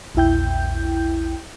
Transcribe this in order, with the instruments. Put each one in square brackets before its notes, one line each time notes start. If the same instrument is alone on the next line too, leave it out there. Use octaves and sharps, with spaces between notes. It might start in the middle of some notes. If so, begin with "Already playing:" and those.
[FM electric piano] A#1 E2 E4 G5 G6